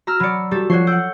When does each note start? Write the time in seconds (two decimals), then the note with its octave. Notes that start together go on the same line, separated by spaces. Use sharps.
0.07 F#4 A#5 E6 F6
0.20 F#3 D5 B5 C#7
0.51 G3 F#4 G4 A4 A6
0.70 F3 F#4 C#5 D5 C#6 C7
0.87 F#5 G5 E6